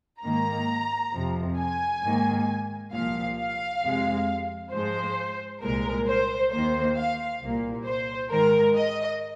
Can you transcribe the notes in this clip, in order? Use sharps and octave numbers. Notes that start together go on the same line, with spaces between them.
G#2 D#3 A#3 A#5
F2 C3 F3
G#5
G#2 D#3 A#3
C2 A#2 F3 F5
F5
F2 C3 G#3
G#2 F3 G#3 C5
C2 A#2 G#3 A#4
C5
D#2 D#3 A#3 C5
F5
C2 A#2 A#3
C5
G#2 D#3 G#3 A#4
D#5